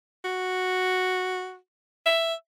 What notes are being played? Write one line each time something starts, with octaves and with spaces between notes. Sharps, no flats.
F#4
E5